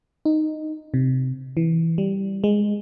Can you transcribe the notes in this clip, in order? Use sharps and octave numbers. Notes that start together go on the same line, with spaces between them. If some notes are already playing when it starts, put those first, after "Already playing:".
D#4
C3
E3
G3
G#3